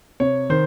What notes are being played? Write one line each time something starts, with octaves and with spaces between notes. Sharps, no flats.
C3 C#5
D#3 C5